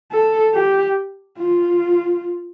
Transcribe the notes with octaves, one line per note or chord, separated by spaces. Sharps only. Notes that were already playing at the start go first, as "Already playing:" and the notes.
A4
G4
F4